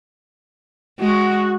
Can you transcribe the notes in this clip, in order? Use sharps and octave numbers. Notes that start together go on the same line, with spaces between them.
G#3 F#4